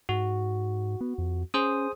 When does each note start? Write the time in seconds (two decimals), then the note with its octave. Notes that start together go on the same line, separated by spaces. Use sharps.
0.09 G#2 F#4
1.01 B3
1.18 F2
1.54 C#4 G#4 C5 D#6